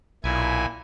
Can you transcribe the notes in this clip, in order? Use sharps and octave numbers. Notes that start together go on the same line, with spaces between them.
B1 A#2 E4 G#5